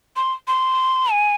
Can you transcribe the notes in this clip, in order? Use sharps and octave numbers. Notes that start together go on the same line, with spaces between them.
C6
C6
G#5